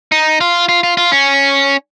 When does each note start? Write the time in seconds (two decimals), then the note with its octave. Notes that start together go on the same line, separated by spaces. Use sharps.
0.12 D#4
0.41 F4
0.69 F4
0.83 F4
0.97 F4
1.12 C#4